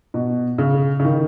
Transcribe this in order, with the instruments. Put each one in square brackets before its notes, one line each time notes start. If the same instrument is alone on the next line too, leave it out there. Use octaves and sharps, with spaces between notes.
[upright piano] B2
C#3
C#3
D#3